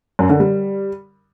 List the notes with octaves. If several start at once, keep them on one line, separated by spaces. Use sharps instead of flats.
F#2
D3
G3